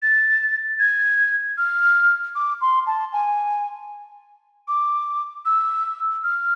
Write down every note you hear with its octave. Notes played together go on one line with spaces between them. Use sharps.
A6
G#6
F6
D6
C6
A5
G#5
D6
E6
F6